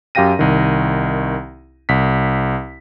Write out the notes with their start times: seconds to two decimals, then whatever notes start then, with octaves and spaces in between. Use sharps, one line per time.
0.15 F#2 G4 F5 G5 A#6 D#7
0.39 C2 D#3
1.89 C2 B6